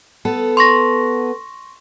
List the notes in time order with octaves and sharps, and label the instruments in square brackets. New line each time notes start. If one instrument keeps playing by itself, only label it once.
[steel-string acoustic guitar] B3 A4
[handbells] C6 C#6 A#6